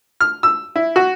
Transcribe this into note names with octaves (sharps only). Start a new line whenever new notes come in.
F6
E6
E4
F#4